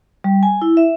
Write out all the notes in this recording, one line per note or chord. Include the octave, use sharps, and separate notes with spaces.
G3
G#5
E4
E5